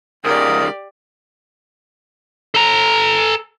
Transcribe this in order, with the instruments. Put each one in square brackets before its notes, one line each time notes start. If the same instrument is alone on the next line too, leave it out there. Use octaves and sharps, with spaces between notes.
[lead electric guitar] C#2 G#2 [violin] G4 D5 [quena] A#4 [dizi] D#6
[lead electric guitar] A4 A#5